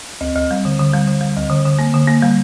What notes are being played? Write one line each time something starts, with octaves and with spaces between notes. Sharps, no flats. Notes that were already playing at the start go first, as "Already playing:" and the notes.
D2
D2
G3
D3
D3
G3
D3
G3
D2
D3
D3
A#3
D3
A#3
G3